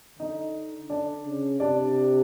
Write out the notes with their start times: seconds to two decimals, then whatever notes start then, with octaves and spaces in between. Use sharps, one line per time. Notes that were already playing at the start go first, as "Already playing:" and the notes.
0.19 D3 D#4 D#5
0.90 D3 D4 D5
1.25 C#3
1.60 C3 D4 D5